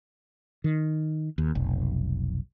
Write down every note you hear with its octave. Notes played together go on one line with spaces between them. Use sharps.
D#3
D#2
F1 B1